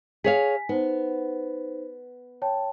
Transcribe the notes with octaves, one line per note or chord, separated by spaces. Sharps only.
G#4 C#5 F5 G#5 B6
B3 D#4 C5
C#5 G5 A5